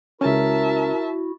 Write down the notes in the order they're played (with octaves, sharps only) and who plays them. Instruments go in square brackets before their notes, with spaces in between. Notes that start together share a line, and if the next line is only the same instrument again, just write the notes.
[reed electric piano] C#2 C#4 [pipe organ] E4 F#4 [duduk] A#4 [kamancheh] E5 A5